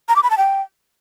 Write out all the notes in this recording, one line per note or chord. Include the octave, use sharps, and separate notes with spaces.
A#5
D6
B5
A5
G5